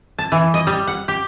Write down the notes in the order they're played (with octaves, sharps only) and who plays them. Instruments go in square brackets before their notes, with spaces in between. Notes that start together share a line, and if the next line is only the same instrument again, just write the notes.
[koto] A5
E3
D#5
G3
F#5
G4